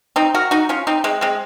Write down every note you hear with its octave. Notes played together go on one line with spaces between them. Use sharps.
C4 D#4
F#4 A#4
D#4 F#4
C#4 F4
C4 D#4
G#3 C4
G#3 C4